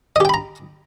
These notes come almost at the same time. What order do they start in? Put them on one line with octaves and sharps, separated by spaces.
D#5 G4 G5 B5 A#5